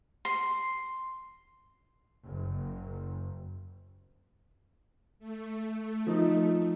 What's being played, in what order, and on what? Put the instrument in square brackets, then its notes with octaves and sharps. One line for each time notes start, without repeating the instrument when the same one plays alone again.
[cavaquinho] C6
[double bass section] F#1
[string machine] A3
[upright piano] F3 D#4